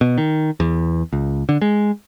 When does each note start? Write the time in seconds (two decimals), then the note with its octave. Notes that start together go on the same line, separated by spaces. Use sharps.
0.01 B2
0.18 D#3
0.60 E2
1.13 C#2
1.49 D3
1.62 G#3